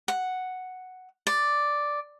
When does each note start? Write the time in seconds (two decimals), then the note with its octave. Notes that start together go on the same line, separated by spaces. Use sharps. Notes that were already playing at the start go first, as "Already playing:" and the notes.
0.08 F#5
1.27 D5